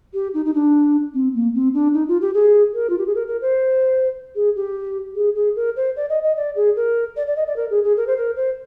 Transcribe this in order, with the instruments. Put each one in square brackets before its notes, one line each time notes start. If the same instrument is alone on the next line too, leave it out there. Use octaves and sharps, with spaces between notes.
[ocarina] G4
D#4
D#4
D4
C4
A#3
C4
D4
D#4
F4
G4
G#4
A#4
F4
G4
G#4
A#4
A#4
C5
G#4
G4
G#4
G#4
A#4
C5
D5
D#5
D#5
D5
G#4
A#4
D5
D5
D#5
D5
A#4
G#4
G#4
A#4
C5
A#4
C5